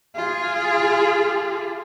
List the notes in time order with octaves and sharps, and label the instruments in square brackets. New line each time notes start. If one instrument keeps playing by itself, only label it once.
[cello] F4 G#4